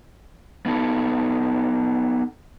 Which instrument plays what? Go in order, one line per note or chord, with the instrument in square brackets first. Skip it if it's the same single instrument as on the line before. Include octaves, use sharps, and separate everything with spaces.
[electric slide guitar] B3 D#4 A4